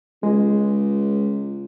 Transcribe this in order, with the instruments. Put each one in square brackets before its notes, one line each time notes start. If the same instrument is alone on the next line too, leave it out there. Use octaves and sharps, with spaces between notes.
[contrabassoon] C#2 [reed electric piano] G#3